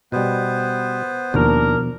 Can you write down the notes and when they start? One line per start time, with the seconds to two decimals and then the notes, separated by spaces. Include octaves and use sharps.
0.12 B2 G3 B3 B4 C5
1.34 D#2 B2 F3 D4 A#4